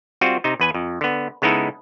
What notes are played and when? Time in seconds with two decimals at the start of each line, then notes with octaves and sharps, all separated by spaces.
0.21 G3 C4 F4 F#4
0.44 C3 D#4
0.60 E2 B4 G#5
0.74 F2
1.01 D3 B3
1.42 C#3 G#3 B3 D#4 E4 A4